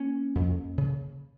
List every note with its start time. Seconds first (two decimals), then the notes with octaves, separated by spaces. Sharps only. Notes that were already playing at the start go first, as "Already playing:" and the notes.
Already playing: A#3 C#4
0.35 F2
0.78 C#3